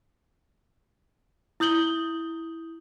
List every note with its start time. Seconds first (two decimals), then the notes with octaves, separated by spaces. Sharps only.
1.60 E4 D#6 G6 F#7 G7